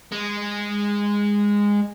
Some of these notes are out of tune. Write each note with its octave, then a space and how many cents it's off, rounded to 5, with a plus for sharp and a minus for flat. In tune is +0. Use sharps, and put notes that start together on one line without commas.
G#3 -15